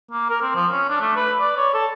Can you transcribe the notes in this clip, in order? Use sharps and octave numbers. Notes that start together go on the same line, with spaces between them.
A#3
A#4
C4
F3
C#4
D4
A3
B4
D5
C#5
A4